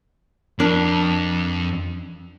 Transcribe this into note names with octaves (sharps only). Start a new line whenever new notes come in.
F2 D4 A#4